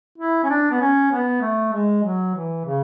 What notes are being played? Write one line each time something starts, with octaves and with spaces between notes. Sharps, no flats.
E4
C#4
D4
B3
C#4
B3
A3
G#3
F#3
E3
C#3